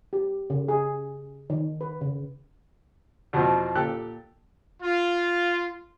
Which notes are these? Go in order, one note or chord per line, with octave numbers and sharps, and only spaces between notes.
G4
C#3
G#4
D#3
B4
C#3
E2 B2 F3 C4
A#2 G4 A4 F#6
F4